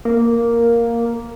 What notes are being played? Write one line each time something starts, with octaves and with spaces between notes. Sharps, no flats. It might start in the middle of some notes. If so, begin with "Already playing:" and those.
A#3